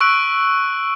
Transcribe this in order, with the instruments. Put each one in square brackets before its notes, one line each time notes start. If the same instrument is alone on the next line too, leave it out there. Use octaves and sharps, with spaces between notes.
[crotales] C#6 E6 F#6 D7 F#7